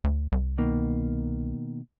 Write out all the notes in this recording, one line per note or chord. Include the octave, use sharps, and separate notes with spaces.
D2
C2
B2 D#3 A#3